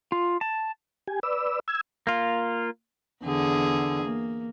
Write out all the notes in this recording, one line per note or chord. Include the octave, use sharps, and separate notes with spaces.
F4
A5
G4 G#5
B4 D5 E6
E6 G#6
A#3 F4
E2 D3 G#4
A#3